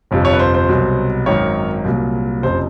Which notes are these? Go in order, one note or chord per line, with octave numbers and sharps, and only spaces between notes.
G1 F2 C3
C#5
B4
C5
C5
C2 B2 F#3
G#1 F#2 D#3 F#3 C#5
C2 A#2 F#3
F#1 F2 C3 C5